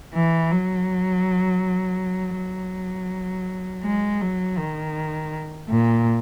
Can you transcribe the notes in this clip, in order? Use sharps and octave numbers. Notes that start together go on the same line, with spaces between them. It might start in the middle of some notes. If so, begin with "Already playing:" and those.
E3
F#3
F#3
G#3
F#3
D#3
A#2